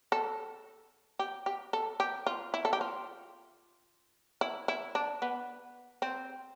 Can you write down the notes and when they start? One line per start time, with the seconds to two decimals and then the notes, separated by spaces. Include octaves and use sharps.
0.12 A4
1.19 G4
1.46 G4
1.73 A4
2.00 G4
2.27 F4
2.54 E4
2.65 A4
2.73 G4
2.81 F4
4.41 E4
4.68 E4
4.95 D4
5.22 B3
6.02 C4